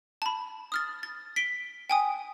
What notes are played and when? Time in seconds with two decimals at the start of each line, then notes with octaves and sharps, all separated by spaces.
0.22 A5 B5
0.72 D#6 F6 A6
1.03 A6
1.36 B6 D7 G7
1.90 G5 G#5 D#6